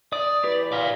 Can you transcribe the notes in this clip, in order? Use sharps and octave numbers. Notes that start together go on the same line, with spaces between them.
D5 D#6
E3 E4 G4 B4
D5 F5